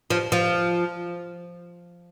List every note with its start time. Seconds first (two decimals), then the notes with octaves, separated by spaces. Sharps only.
0.10 F3
0.32 F3